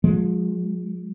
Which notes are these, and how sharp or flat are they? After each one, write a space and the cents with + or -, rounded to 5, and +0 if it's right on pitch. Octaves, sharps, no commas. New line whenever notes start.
F3 +40 G#3 +0